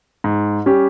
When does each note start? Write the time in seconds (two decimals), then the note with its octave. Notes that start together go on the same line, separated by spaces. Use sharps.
0.24 G#2
0.66 G3 C#4 G4